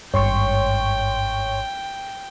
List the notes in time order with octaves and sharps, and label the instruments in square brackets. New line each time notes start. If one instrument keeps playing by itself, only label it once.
[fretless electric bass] G#1 G2 [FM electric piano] C#5 C6 C#6 [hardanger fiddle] G5